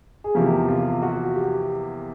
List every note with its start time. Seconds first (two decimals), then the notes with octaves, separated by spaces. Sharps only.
0.24 G#4
0.35 E2 C3 F3 A#3 G4
0.69 F4
1.02 F#4
1.35 G4